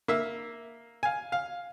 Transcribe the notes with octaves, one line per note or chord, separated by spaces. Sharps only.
A#3 E5
F5 G#5
F5